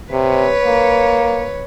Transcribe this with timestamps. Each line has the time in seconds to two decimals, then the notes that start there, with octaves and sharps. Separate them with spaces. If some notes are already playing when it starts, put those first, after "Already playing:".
0.12 C3 B4 C#5
0.65 A#3